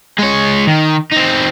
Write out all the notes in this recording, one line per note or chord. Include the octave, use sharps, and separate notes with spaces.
G#3 C#5
D#3
C4 D#4